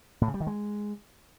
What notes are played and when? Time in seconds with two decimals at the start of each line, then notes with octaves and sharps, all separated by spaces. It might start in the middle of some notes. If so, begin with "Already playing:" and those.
0.21 A2
0.28 C#3
0.34 G3
0.40 D#3
0.47 G#3